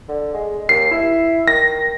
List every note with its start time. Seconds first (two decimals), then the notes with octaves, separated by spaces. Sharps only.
0.08 D3
0.34 G#3
0.69 D#2 C7
0.91 E4
1.48 D#3 A#6